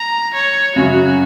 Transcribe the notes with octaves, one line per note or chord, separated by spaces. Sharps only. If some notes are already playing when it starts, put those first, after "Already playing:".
Already playing: A#5
C#5
F#2 C#3 F#3 F#4